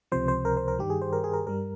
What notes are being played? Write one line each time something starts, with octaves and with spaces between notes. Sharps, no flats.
C#2 C3 F3 C5
C5
A#4
C5
A#4
G2 D#3 G3 G4
G#4
C5
A#4
G#4
A#4
G2 G3 A#4